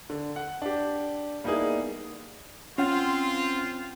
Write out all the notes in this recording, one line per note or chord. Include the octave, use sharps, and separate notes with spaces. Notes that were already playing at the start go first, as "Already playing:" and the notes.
D3
F#5
D4 G4
G3 A#3 B3 D#4 E4 G#4
C4 C#4 F4 F#5